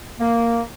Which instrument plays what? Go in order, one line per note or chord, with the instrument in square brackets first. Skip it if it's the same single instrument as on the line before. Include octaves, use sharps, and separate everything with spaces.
[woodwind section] A#3